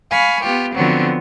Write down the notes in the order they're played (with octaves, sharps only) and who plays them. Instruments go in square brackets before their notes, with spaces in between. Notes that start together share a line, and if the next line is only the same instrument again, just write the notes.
[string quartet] F5 G#5 B5 C#6
B3 F4 G4
D3 F3 F#3 B3 C4